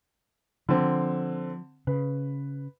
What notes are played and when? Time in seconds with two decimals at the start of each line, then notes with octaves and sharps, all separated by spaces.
0.69 D3 F3 C4
1.87 C#3 B4